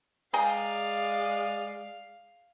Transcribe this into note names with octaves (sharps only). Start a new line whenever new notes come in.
G#3 G#4 D5 F5 G5 A#5